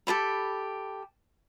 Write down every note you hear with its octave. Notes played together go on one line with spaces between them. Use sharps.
G4 A4 C5 B5